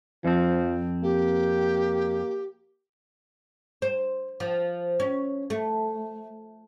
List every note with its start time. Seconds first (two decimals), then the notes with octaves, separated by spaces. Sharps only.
0.25 F2 F3 C4
1.03 A#3 G4
3.82 C5
4.40 F3
5.00 C#4
5.50 A3